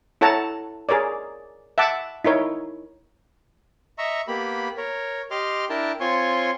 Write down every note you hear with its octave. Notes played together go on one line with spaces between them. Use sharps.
E4 A4 C#5 F#5 A5 A#5
G#4 A#4 C#5 D5
E5 F#5 A5 D6
D#4 E4 A#4 C#5
D#5 E5 A#5 C#6 E6
A#3 B3 G4 B5
A#4 C#5
G4 D#5 C6 D6 F6
D4 E4 A#4 G5 A5
C4 F4 C#5 G#5 C6 C#6